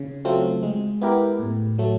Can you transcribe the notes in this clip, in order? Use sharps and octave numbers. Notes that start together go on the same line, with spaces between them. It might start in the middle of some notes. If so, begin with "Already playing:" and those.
Already playing: C#3
F#3 A3 C4 F4
G#3
B3 E4 G4 A#4
A2
F#3 A3